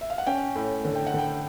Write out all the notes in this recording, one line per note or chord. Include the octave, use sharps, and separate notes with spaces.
E5
F5
F#5
C#4 G5
A2
D3
G5
F#5
D3 G5